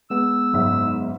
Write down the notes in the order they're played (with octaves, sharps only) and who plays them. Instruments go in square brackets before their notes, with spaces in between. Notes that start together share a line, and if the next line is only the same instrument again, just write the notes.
[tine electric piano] G#3 B3 G#4 [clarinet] E6
[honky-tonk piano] F#1 G#2 E5